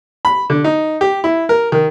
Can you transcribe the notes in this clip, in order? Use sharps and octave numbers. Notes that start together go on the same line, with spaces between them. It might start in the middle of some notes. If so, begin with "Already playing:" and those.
B5
D3
D#4
G4
E4
A#4
D#3